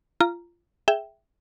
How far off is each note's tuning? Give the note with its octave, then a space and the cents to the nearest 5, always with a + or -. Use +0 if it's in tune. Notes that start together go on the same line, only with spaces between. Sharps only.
F4 -20 A#5 +0
G#4 +0 E5 +0 G5 +0